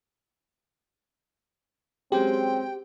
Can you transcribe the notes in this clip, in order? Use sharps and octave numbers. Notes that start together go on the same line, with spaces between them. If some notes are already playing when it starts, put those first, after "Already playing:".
F#3 G#3 C4 C#4 G4 G5